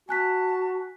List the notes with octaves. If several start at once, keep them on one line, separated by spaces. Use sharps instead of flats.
F#4 G#5 A5 F#6 B6